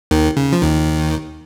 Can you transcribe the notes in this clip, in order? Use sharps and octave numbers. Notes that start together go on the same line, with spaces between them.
D#2 D#3
C#3
F3
D#2 D#3